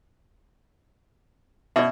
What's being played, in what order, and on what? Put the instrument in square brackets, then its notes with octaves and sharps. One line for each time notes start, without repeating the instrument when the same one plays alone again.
[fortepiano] B2 [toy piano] D5 E5